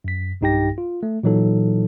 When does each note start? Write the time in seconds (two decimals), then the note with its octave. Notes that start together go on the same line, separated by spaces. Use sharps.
0.04 F#2 B6
0.41 B1 G2 D#4 G4 G5 A#6
0.78 F4
1.03 A3
1.23 A#2 E3 F#3 D#4 A4